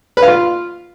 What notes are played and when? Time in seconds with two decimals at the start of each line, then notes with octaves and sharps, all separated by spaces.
0.17 B4
0.22 F5
0.28 F4